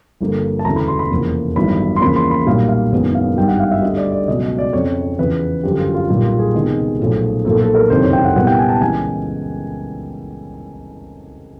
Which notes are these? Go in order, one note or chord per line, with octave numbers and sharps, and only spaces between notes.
G1 G2 D3 F3 A#3
A5
E1 D2 C#3 E3 A#5
B5
C6
B5
F1 E2 C#3 F3 A#3
A1 G2 D#3 F#3 B3 B5
C6
E2 C#3 F3 A#3 B5
C6
B5
B1 A#2 G3 A#3 F5
F5
F#1 F#2 D#3 G#3 B3
F5
G#1 G2 D#3 G3 G5
F#5
F5
E5
D2 D3 G3 D#5
D5
D5
C#2 B2 F#3 D#5
D#5
D5
F2 C#3 F3 C#5
E2 C#3 F3 B4
G1 F#2 D3 F3 G4
F4
F4
B1 A#2 G3 A#3 F4
F4
G#4
C#2 C3 D#3 G#3 B3
B1 A#2 F3 A3
B1 A#2 F3 A#3 A4
A4
A#4
F#1 F2 C3 D#3 C5
C#5
G5
F#5
C2 A#2 G3 B3 F#5
G5
G#5
A5
C#2 C#3 E3 G#5